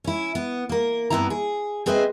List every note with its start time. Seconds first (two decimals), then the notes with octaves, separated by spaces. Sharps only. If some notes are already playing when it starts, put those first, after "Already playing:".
0.04 C#4 E4
0.35 B3
0.69 A#3 A#4
1.10 G2 A#2 B3 C4 E4 A#5
1.30 G#4
1.86 C4 G#4 B4 C5 D#5 E5